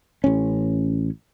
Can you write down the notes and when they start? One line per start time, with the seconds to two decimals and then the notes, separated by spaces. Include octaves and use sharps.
0.24 A1 C#4